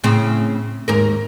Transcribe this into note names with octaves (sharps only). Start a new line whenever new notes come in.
A2 C#3 C4
D#2 G#2 A#4